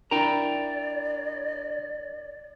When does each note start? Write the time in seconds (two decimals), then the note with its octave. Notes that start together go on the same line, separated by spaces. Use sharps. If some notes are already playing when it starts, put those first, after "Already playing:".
0.11 D4 E4 A#4 D5 G5 A#5